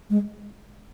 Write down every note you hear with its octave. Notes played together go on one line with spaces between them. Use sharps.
G#3